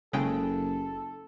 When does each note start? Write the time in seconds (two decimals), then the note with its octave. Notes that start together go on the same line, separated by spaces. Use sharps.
0.13 F#1 C#3 G#3 A4 G5